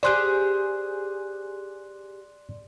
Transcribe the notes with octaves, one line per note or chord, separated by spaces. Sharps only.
G4 G#4 C5 D5 C6 F#6